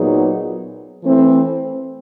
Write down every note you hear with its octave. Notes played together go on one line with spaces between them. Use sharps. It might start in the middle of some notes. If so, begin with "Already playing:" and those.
Already playing: A#2 F#3 B3 D#4 G#4
E3 A3 C4